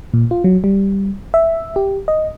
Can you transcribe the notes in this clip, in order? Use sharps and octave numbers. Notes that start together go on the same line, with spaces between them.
A#2
F4
F#3
G3
E5
G4
D#5